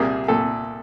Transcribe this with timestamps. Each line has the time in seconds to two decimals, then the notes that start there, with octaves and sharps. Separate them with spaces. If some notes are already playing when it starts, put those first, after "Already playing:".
Already playing: C2 A#2 G3 A#3 G#4
0.28 A#2 A4